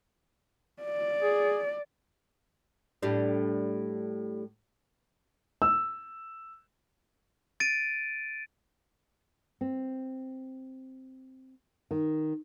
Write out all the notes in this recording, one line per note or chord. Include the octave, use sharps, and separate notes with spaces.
D5
G#4
A2 G3 D4
E6
A6 D7 D#7
C4
D#3